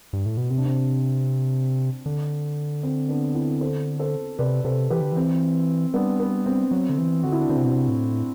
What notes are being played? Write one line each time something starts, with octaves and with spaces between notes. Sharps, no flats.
G2
A2
B2
C3 C4
D4
C4
D3
C4
B3 D4
C4 E4
A4 C5
A4 C5
C3 B4 D5
C3 A4 C5
E3 G4 B4
D3
E3 C4
G3 B3 D4
B3
C4
F#3
D3
E3
D3 F#4
E4
D4
D3 C4
C3
B2
C3
A2